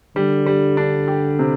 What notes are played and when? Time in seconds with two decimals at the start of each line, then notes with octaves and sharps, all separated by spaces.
0.16 D3 G3
0.46 G3
0.77 D4
1.08 G4
1.39 C3